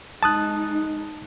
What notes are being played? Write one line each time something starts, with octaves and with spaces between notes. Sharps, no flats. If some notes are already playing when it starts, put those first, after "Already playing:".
G#3 D#4 A5 D#6 F#6